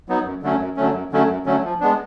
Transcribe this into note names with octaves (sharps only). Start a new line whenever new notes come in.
F#3 B3 D#4
F#2
D3 F#3 A3 C#4
F#2
D3 F#3 A3 C#4
F#2
D3 F#3 A3 C#4
F#2
D3 F#3 A3 C#4
F3
G#3 B3 D4